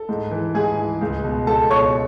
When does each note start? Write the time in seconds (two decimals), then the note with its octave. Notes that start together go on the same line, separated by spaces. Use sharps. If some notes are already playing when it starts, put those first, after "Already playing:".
Already playing: A4
0.09 G#2
0.31 E3
0.54 G#2 G#4 G#5
0.78 E3
1.01 C#2
1.24 B2
1.47 C#2 A4 A5
1.70 B2 C#5 C#6